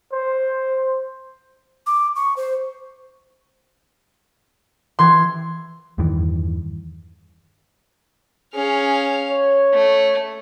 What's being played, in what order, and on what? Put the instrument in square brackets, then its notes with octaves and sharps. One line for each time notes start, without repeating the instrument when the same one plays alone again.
[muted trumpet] C5
[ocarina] D6
C#6
C5
[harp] E3 G#6 [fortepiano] C6
[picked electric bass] E2 G2 D#3 E3
[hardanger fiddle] C#4 F5 [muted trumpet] G#4
[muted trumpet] C#5
[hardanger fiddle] A3